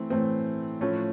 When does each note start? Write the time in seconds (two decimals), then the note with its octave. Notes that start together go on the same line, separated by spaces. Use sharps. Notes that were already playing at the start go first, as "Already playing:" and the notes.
Already playing: E3 A3 C4
0.10 A2 E3 A3 C4
0.81 A2 F3 A3 C#4